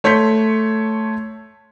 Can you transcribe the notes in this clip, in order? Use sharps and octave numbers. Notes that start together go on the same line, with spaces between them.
A3 C#5 C6 G6 B6